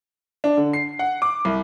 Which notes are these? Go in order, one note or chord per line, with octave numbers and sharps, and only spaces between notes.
D4
D3
C7
F#5
D6
C2